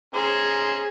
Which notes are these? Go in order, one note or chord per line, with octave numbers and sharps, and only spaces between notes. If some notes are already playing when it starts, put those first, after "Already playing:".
C#4 G#4 C5 A#5